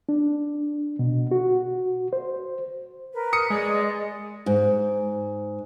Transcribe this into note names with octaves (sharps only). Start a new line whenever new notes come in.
D4
B2
F#4
C5
A#4 B4
D#6 C#7
G#3 G#4 D5 D#5
G#2